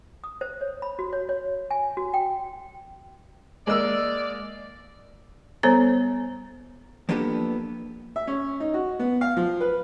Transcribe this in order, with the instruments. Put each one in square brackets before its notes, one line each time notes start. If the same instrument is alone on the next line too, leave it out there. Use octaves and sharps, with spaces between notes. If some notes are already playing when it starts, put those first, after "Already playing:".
[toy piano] D#6
C5
C#5
B5
F#4
C#5
C#5
G#5
F#4
G5
[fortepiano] G#3 A#3 E6 [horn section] D5
[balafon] G3 B3 A4 C5 C#5 A#5
[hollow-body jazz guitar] F3 A#3 B3 D4 G4 A4
[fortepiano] E5
C#4
D#4
F#4
B3
F5
F3
B4